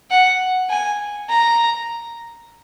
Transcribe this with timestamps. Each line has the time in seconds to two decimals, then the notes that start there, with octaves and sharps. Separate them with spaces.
0.11 F#5
0.70 G#5
1.30 A#5